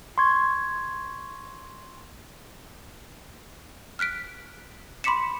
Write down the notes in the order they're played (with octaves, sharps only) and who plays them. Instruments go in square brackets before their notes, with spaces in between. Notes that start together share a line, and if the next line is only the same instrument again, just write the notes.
[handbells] C6 C#6 G#6
[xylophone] F6 F#6 B6 D7
B5 C6 D6 B6 C#7 E7